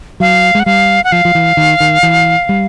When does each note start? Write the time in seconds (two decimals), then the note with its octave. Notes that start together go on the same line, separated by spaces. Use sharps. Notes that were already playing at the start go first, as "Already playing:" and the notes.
0.20 F#3 F5
0.55 G#3
0.60 F#5
0.66 G3 F5
1.04 F#5
1.12 F3 F5
1.25 F3
1.35 E3
1.57 D#3
1.80 D#3
2.03 E3
2.49 G3